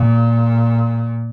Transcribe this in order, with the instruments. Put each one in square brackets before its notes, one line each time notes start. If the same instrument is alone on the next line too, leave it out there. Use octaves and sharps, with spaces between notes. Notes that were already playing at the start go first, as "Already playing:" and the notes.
Already playing: [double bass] A#2